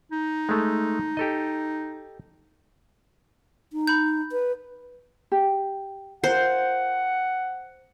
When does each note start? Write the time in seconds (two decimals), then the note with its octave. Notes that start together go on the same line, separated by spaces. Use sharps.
0.12 D#4
0.49 G#3 A3
1.17 G4 A4 D#5
3.73 D#4
3.87 B5 G6
4.32 B4
5.32 G4
6.24 F4 A#4 C5 F#5